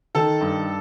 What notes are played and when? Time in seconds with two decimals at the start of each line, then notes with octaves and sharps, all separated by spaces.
0.15 D#3 A4 A5
0.41 G2